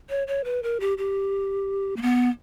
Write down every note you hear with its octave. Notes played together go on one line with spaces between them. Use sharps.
C#5
C#5
B4
A#4
G4
G4
A#3
B3